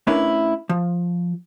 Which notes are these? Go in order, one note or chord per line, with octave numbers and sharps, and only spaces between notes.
A3 C#4 D4 E4 A#4 B4
F3